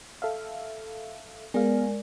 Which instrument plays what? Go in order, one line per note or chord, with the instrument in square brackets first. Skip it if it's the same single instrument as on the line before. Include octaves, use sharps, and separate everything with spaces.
[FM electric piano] A4 E5 F5
[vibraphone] G#3 A#4 D5 [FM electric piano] B3 G#4 F5